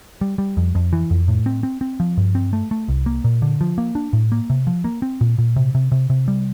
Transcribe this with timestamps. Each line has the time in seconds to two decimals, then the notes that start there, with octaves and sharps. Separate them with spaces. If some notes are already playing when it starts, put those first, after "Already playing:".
0.21 G3
0.38 G3
0.57 F2
0.75 F2
0.93 E3
1.11 F2
1.28 A2
1.46 C4
1.63 C4
1.81 C4
2.00 F3
2.17 G2
2.35 C4
2.53 A3
2.71 A3
2.88 C2
3.06 A#3
3.24 A#2
3.42 D3
3.61 F3
3.78 A#3
3.95 D4
4.13 A2
4.32 A#3
4.50 C3
4.67 F3
4.84 A#3
5.02 C4
5.21 A#2
5.38 A#2
5.56 C3
5.75 C3
5.92 C3
6.10 C3
6.28 G3